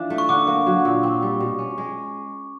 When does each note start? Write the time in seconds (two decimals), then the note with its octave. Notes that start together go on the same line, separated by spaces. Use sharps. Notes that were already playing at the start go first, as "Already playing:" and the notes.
Already playing: E3 F3 D4
0.10 A3
0.18 C#6
0.29 D3 D6
0.47 A#3
0.66 F#3
0.85 A#2
1.03 C4
1.22 G3
1.40 B2
1.59 C#4
1.78 G#3